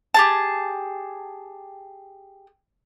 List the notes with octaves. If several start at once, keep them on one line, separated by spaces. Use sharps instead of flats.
G4 G#4 A5